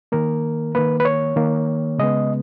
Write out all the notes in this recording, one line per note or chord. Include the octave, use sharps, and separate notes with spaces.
D#3 A#3 A#4
D#3 A#3 B4
B4
C#5
D#3 A#3
C#3 G#3 B3 D#5